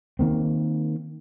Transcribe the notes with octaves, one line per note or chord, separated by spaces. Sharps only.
D#3 A#3 C4